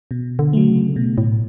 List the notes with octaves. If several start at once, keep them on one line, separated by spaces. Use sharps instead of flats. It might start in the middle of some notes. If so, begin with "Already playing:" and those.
B2
D3
F#3 A3
C#3
B2
A2